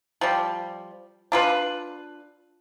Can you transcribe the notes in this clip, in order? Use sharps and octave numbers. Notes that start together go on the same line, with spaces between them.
F3 G3
D4 F4 B4